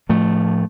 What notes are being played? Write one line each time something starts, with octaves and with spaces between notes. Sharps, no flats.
A2 F3 A3